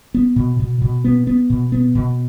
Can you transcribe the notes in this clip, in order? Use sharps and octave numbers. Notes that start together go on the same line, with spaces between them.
B3
B2
B2
B2
B3
B3
B2
B3
B2